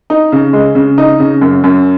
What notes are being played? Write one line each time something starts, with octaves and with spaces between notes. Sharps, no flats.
D#4
C#3
G#3
C#3
D#4
C#3
F#2
F#2